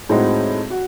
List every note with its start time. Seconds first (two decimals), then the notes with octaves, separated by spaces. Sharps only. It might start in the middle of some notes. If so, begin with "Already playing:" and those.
0.09 A2 G#3 C4 D#4 F#4
0.70 F#4